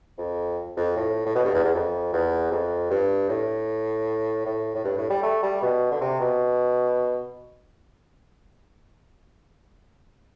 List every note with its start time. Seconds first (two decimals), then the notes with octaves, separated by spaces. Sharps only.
0.18 F2
0.77 F2
0.96 A2
1.26 A2
1.35 B2
1.45 G2
1.54 E2
1.64 E2
1.74 F2
2.13 E2
2.51 F2
2.91 G2
3.29 A2
4.46 A2
4.75 A2
4.85 G2
4.98 A2
5.10 G3
5.23 A3
5.43 G3
5.62 B2
5.91 D3
6.01 C3
6.20 B2